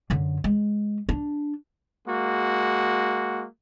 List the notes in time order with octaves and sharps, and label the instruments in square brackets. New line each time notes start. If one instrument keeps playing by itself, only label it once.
[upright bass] F#2 D3
G#3
D4
[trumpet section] G#3 A#3 F#4